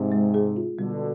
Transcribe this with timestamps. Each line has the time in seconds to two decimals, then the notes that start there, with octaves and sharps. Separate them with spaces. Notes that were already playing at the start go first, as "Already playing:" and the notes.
Already playing: G#2 C3 C4
0.12 G#3
0.34 G#4
0.56 F4
0.79 B2 D3 G3